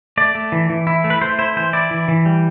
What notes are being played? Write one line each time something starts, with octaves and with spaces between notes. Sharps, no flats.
A3 D5
A3
E3
E3
E4
A3
B4
A3 C5
E4 C5
E3 C5
E4 D5
E3
E3
G3